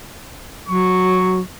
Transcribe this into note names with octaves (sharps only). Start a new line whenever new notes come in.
F#3 C#6